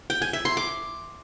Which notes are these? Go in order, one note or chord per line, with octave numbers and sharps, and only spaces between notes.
G5
G#5
E5
C6
D6